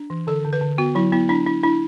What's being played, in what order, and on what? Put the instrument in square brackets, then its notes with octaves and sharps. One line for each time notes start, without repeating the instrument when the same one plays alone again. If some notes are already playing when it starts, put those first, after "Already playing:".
Already playing: [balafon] D4
E3
D3 A4
D3
B4
D3
B3 F#4
F#3 E4
B3 E4
D4 E4
D4 E4
D4 E4